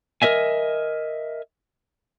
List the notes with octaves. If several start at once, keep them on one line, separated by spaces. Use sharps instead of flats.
A#4 B4 D#5 E5 G#5